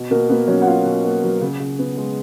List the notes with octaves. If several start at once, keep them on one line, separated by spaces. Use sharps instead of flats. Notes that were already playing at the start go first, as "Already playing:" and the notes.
Already playing: B2
B2 A#3 A#4
A#3 B3 B4
F#3 C#4 C#5
F#5
B2 F4 F5
B2
A#3
F#3
C#3
C#3
B3
G#3